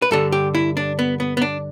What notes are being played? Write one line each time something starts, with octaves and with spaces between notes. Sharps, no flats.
B4
G2 D3 A4
G4
E4
D4
B3
B3
B3
D4